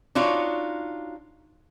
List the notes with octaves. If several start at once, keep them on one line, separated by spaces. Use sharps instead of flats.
D4 D#4 F4 F#4 C#5